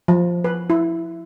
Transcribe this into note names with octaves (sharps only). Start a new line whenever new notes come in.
F3
B4
E4